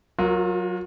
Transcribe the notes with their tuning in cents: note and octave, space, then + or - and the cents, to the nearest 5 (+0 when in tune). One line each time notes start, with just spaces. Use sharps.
F#3 -10 F4 +35 A#4 +0